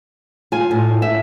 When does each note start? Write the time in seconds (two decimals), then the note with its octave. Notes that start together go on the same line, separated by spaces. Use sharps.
0.52 F4 G#5
0.71 A2
1.02 E5